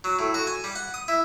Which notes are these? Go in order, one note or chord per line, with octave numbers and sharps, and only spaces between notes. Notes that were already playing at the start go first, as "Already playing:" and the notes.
F#3
A2
F#4
G#5
G3
F#5
D#6
E4